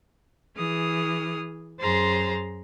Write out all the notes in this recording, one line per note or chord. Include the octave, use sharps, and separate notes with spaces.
E3 G#4 D#6 F6
F#2 G#4 C5 A#5 C6 A6